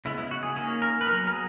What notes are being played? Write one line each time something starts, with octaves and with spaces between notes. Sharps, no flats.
C#3 G#3 B3 E4
E4
F#4
G#4
D#3 A#3 C#4 G#4
A#4
B4
F#3 B3 A#4
A#4
G#4